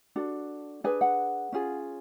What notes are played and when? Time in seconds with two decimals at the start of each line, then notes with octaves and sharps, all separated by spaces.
0.16 D4 F#4 A4
0.84 D4 G#4 B4 G#5
1.01 F#5
1.52 C#4 F4 G#4